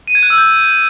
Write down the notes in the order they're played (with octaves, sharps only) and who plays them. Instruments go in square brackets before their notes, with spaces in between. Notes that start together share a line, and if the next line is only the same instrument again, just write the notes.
[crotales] D#7
G#6
F#6
E6
G6